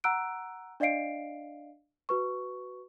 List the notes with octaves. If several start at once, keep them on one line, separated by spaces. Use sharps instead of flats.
F#5 A#5 E6 F#6 D7
D4 D5 D#5 F5 C7 D7
F#4 B4 C#6